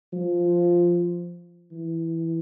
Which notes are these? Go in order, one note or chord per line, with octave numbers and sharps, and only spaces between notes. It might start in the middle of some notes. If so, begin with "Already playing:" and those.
F3
E3